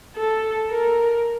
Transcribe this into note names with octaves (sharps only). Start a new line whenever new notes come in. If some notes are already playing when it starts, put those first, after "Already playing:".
A4
A#4